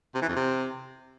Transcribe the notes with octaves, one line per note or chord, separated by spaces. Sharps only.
C3
E3
F2
C3